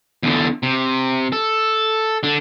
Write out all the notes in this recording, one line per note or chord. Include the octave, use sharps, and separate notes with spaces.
E2 D3
C3
A4
D3 D4